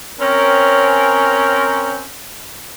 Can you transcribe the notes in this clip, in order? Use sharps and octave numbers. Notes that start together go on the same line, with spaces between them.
C4 C#4 A#4